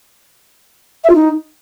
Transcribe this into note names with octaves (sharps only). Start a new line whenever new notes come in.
E5
F4
D#4